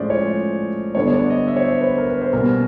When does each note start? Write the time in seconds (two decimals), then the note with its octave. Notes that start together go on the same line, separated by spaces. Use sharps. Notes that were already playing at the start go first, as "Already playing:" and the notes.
Already playing: A2 F3 G#3 C#4 C5 D5
0.10 C#5
0.95 D3 G3 B3 D4 C#5
1.07 C#5
1.13 D5
1.30 D#5
1.47 E5
1.57 C#5
1.64 C5
1.81 B4
1.98 A#4
2.10 B4
2.22 C5
2.33 B2 G3 A#3 C#4 A#4